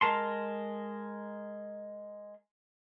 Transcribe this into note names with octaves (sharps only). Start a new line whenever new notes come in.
G#3 A#4 A5 C6